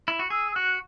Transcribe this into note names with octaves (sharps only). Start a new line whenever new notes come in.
E4
F#4
G#4 E6
E6
F#4 F#6